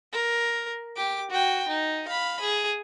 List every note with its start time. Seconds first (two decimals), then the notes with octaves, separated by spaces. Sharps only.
0.13 A#4
0.96 G4 D6
1.31 F#4 G5
1.68 D#4
2.08 F5 B5
2.41 G#4